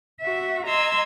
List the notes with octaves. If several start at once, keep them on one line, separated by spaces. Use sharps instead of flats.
F#4 E5
D#5 A#5 C6 E6 G#6